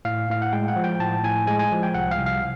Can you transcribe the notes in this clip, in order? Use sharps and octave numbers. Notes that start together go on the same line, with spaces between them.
A2 F5
A2 F5
F#5
G#3 G5
F#5
F3
G5
A2 A5
A2 G#5
G#3 G#5
G#5
F3
G5
C2 F#5
F5
C2
F5